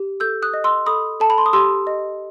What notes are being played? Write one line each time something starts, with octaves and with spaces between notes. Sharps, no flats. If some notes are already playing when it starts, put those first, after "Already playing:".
Already playing: G4
A4 E6 G6
D#6 F#6
D#5
C6 E6
A4 B5 D#6
A4 A5
B5
C6
D#6
G4 C6 E6
D#5